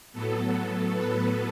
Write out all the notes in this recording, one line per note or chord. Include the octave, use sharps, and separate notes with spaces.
A2 F#3 B3 A4
B4